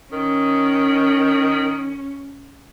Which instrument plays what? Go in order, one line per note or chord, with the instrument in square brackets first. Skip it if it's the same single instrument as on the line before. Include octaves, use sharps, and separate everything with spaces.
[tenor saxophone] D#3 [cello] C#4